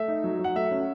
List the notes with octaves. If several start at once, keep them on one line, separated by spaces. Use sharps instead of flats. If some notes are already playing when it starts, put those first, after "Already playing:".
Already playing: A3 E5
D#4
F#3
F#3
F#5
A3 E5
C#4